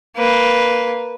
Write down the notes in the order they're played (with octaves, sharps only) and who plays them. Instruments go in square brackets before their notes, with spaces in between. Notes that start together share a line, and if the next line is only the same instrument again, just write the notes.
[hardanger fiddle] A#3 B4